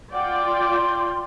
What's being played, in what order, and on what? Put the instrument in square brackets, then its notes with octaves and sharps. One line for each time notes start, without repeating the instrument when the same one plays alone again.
[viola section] F4 D5 G5 [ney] F#5
[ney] C6